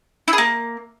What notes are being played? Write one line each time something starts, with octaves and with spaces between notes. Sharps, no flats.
E4
G#4
A#3